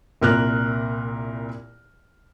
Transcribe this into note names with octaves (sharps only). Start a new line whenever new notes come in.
C2 A#2 A#4 E5 F6 F#6